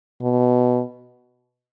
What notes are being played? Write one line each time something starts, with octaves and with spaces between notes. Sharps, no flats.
B2